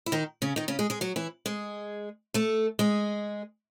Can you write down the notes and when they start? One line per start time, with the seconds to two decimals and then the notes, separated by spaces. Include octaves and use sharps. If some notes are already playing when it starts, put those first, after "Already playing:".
0.06 E4
0.12 D#3 D#4
0.42 C#3 C#4
0.56 D#3 D#4
0.68 C#3 C#4
0.79 G#3 G#4
0.90 G#3 G#4
1.01 F#3 F#4
1.16 E3 E4
1.46 G#3 G#4
2.34 A3 A4
2.79 G#3 G#4